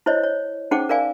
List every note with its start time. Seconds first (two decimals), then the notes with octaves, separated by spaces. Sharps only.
0.06 E4 C5 C#5 D#5
0.23 C#5
0.71 C#4 D#4 G#4 C5 F#5 D6
0.89 A#4 D5 F5 G#5